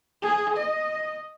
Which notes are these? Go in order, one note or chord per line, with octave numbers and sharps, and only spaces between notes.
G#4
D#5